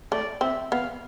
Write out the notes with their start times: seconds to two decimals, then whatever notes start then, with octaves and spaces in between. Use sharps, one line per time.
0.12 A3 D5
0.41 C4 E5
0.72 B3 F5